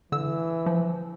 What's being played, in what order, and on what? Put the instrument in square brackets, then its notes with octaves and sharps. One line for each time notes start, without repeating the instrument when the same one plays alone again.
[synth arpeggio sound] D3 E6 [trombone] E3
[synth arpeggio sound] F3